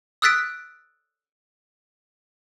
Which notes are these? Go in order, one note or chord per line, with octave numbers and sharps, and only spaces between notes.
D#6 E6 F#6 A6 B6 D7